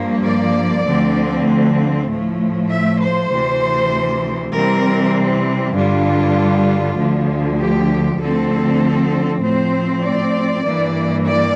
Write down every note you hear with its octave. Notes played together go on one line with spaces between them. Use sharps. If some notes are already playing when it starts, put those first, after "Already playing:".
Already playing: G2 F3 A#3
D5
D2 D3 F3 C4
A2 F3 A3
E5
C5
D2 C3 E3
C3 E3 G3 C4 A#4
G2 D3 G3 D4 F4
D2 D3 F3
G4
D2 D3 F3 A3 C4 A4
A2 F3 C4 C5
D5
G2 E3 A#3
D5